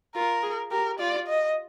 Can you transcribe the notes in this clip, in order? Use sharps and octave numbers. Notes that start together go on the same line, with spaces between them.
F4 A#4
G#4
G4 A#4
F4 D5
D#5